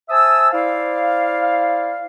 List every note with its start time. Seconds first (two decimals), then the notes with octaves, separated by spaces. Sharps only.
0.09 C5 E5 G#5 A5 D#6 E6
0.52 E4 C5 D5 F5